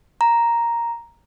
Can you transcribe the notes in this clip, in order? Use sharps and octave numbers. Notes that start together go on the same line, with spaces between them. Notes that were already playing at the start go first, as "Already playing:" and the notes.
A#5